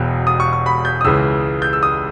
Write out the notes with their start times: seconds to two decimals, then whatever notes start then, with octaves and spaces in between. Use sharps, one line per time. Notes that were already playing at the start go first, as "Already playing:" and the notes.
Already playing: E1 E2 B2 G5
0.27 D#6
0.40 C#6
0.53 C#6
0.66 B5
0.85 G6
1.01 D#6
1.04 C#2 C#3 E3 E6
1.62 G6
1.73 E6
1.83 D#6